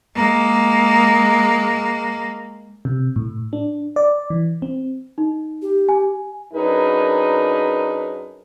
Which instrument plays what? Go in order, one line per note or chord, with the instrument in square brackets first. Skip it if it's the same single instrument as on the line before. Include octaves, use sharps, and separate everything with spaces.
[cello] G#3 A#3
[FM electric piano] C3
A2
D4
D5
E3
C4
[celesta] D#4
[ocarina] G4
[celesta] G#5
[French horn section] F#2 D4 D#4 G#4 A#4 B4